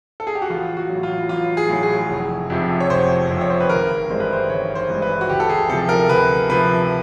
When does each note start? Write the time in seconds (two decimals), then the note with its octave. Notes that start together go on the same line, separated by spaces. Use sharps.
0.20 A4
0.27 G#4
0.35 G4
0.42 F#4
0.50 A1 F4
0.77 F#4
0.89 F#3
0.95 A2
1.03 F4
1.29 A1 F4
1.57 G#4
1.69 A2 F#3
1.83 G#4
2.10 F1
2.50 F2 C3 F3
2.80 C#5
2.90 F1 C5
3.29 F2 C3 F3
3.41 C#5
3.50 C5
3.60 B4
3.69 G#1 A#4
4.10 G2 E3 G#3 C5
4.20 B4
4.33 C5
4.50 G#1 C#5
4.75 C5
4.89 G2 E3 G#3
5.02 B4
5.21 F#4
5.29 D2 G4
5.40 A4
5.50 G#4
5.70 C3 F3 A4
5.89 A#4
6.09 D2 B4
6.49 C3 F3 B4